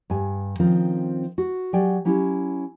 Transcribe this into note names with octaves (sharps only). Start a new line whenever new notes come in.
G2 G#5
D#3 F3 C4 C#4 F4 A#4
F#4
F#3 G4 D5 G5 G#5
F#3 C#4 E4 G4